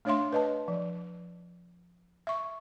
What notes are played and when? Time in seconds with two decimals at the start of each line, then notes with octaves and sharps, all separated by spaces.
0.05 A3 D4 C#5 E5 F5 C6
0.32 B4 D#5 A5
0.68 F3
2.27 E5 C#6